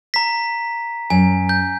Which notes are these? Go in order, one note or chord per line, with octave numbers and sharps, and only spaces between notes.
A#5 B6
F#2 G#5
G6